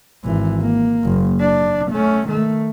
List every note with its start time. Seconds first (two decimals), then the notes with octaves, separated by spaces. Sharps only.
0.24 G#1 E3
0.62 A#3
1.04 F#1
1.41 D4
1.92 A3 C#4
2.28 D#3 A3